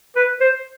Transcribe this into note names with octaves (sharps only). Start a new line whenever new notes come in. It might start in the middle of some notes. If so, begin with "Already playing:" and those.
B4
C5